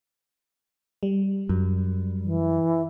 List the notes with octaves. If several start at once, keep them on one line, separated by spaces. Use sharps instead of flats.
G3
F#2
E3